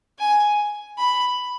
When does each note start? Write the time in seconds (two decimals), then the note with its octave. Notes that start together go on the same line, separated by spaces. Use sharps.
0.19 G#5
0.98 B5